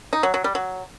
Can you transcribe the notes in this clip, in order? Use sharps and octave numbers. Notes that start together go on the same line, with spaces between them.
D#4
F#3
F#3
G3
F#3